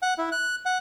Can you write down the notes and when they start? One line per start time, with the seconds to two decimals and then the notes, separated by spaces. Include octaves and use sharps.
0.02 F#5
0.18 E4
0.32 F#6
0.66 F#5